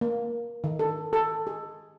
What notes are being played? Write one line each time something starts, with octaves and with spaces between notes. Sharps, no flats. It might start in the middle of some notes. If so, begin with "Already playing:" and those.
A#3
D#3
A4
A4
G#4